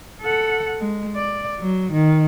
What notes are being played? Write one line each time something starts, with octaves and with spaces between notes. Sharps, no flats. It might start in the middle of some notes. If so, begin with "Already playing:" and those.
A4 F#5
G#3
D5
F#3
D#3